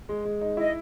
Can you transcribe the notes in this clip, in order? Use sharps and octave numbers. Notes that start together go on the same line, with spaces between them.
G#3
G#3
D#4
E4 D#5